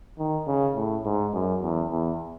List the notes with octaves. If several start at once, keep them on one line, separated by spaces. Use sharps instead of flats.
D#3
C#3
A2
G#2
F#2
E2
E2